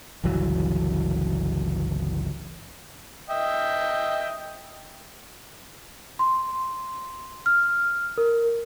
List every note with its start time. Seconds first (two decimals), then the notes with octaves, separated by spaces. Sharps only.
0.24 G1 C#2 E3 F#3
3.30 D#5 E5 G5
6.19 C6
7.46 F6
8.18 A#4